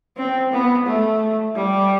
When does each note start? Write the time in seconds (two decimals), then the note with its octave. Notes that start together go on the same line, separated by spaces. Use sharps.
0.18 C4
0.52 B3
0.86 A3
1.55 G3